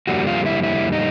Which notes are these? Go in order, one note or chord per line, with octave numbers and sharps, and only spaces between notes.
F2 D3 G3 A#3 F#4
F4
E4
E4
D#4